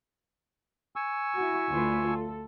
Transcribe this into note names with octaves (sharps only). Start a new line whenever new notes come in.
G#5 C#6 E6
E4 F#4
D2 F4 B4
A4